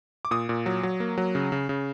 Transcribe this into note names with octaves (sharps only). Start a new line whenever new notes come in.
D6
A#2 D#6
A#2
F#3
F#3
A#3
F#3
C#3
C#3
C#3